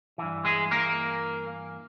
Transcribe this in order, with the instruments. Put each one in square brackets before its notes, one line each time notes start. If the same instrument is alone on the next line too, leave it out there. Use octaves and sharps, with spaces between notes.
[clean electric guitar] G2 E3
G#3 G#4
A#3 A#4